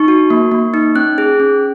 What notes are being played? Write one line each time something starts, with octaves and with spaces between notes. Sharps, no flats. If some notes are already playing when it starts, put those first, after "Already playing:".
Already playing: D#4 C#6
F#4
A#3
A#3
D#4
C#4 F#6
G#4
C#4